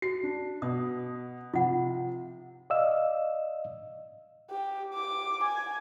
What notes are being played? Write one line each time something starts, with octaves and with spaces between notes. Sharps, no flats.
F#4 C7
D4
B2 D#6
C3 F3 F4 F#5
D5 D#5 F5 E6
G4
D6
G#5